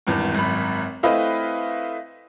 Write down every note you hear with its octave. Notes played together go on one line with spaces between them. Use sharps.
G#1 E2 G2
G#1 F#2 B5
A3 C4 E4 B4 D#5 F5